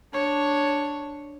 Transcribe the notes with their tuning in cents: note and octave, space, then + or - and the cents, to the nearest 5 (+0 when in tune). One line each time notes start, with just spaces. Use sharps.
D4 +0 C#5 +0